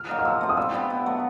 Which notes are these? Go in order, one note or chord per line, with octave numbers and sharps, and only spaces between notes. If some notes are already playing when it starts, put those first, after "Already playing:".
Already playing: F6
F#3 A#3 D#4
F6
F3 E6
A3 C4
D#6
G3 E6
B3 E4
B2
F#3 A3